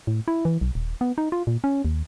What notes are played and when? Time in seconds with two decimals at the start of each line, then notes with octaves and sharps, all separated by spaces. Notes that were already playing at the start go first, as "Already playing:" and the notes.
0.07 A2
0.28 E4
0.45 E3
0.61 B1
0.75 D#1
1.01 B3
1.18 D#4
1.32 F4
1.47 A#2
1.64 C#4
1.85 D#2